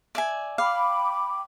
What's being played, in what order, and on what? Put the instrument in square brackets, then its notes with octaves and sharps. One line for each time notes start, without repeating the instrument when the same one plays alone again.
[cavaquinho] D5 E5 G#5
[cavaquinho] F5 [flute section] G5 B5 D6